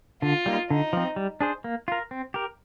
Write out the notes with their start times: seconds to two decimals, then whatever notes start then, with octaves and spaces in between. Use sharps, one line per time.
0.22 D3 F4
0.46 G3 A#3 D#4
0.70 D3 D#4
0.93 F3 C4
1.16 G3
1.41 D4 G#4 C5
1.64 A#3
1.88 F4 A#4
2.11 C4
2.34 G4 A#4